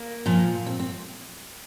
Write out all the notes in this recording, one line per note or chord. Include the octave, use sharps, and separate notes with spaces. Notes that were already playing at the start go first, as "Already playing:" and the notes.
Already playing: A#3
A#2 F3
C4
C4